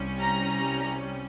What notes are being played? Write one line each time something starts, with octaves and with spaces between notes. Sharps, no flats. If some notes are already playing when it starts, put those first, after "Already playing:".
Already playing: C2 C3 G3 C#4
A#5